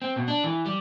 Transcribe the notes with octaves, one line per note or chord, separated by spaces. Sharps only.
C4
B2
D4
E3
G3